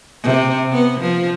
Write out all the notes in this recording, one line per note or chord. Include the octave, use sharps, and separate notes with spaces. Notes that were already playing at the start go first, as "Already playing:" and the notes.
C3
B3
F3